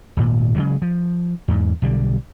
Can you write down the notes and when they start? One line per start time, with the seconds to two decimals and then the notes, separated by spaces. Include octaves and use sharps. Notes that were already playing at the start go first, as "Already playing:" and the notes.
0.17 D#1 G#1 A#2
0.55 C#3 E3 F#3 G#3
0.82 F3
1.48 E2 G#2
1.82 B1 D3 G3